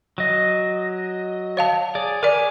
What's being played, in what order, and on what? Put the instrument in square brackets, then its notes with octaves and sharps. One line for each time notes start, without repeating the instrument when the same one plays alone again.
[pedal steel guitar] F#3 D#5
[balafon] C#5 F5 A5
[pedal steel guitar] G#4 D5
[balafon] A#4 D5 [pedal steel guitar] C#5 G#5 D6